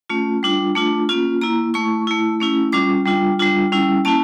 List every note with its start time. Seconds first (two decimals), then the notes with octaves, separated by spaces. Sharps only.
0.10 A3 C#4 F4
0.43 G3 D4 F4
0.75 A3 D4 F4
1.09 A#3 C#4 F4
1.41 A#3 E4 A#5
1.74 A3 E4 C#6
2.07 A3 E4
2.40 A3 C#4 E4
2.72 G3 C#4 F4 D6
3.05 G3 D4 F4
3.39 G3 D4 F4
3.72 G3 C#4 E4
4.05 A#3 C#4 E4 A5